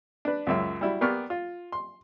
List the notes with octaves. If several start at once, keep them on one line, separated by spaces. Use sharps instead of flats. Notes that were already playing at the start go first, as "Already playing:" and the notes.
D4 B4
C#2 F#2 E5
G3 E4 F#4
A#3 B3 G4 D5 C#6 F6
F4
C6